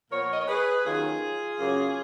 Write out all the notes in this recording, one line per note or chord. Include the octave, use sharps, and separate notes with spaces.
A#2 F3 B3 A#4 C#5
D#5
C#5
G#4 B4
D#2 D#3 F#3 C#4 F4 G#4
F#2 C#3 F#3 A#3